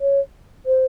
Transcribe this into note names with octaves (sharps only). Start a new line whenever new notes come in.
C#5
C5